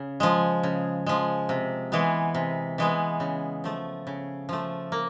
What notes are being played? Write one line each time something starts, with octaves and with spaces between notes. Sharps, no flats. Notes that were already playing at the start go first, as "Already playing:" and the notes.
Already playing: C#3
F3 G#3
C#3
F3 G#3
C3
E3 G#3 B3
C3
E3 G#3 B3
C#3
F3 A3
C#3
F3 A3
A#3